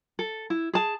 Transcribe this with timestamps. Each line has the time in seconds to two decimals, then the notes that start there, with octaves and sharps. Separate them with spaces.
0.19 A4
0.50 E4
0.73 G#4 A5